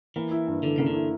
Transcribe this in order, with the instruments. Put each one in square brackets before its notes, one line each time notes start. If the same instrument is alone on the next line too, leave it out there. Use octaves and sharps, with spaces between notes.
[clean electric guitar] E3 [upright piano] A#3
[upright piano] E4
G2
[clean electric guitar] D3 [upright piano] E3
[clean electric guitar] C#3 [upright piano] A#3
[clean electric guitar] D3
[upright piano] E4